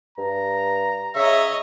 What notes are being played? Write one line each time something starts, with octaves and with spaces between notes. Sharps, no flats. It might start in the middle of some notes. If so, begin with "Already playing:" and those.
G2 A#5
C#3 C#5 D#5 E5